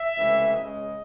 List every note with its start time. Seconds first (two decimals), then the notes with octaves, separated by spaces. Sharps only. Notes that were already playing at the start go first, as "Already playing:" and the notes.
Already playing: E5
0.17 C#2 C3 E3 A3
0.54 C#2 C#3 G#3 D#5